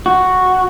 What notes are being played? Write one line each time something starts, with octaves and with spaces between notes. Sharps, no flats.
F#4